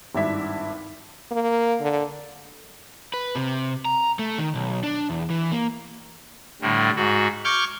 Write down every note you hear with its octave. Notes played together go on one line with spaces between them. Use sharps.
G#1 G2 D4 E4 E5 B6
A#3
D3
B4
C3
A#5
A3
D#3
B1
D4
E2
E3
A#3
A2 D3 G3
G#2 F#4
C#6 D6 F6 G6 G#6